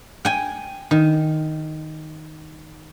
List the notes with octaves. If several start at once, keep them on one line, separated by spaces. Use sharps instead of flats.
G5 G#5
D#3